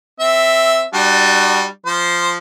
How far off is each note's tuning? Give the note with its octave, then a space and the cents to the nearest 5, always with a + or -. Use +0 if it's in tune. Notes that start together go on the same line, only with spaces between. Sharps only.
C4 +0 E5 +0
G3 +0 D4 +40 F#4 +0
F3 -5 C5 +0